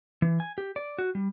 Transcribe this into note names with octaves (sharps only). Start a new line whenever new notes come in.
E3
G#5
G4
D5
F#4
G3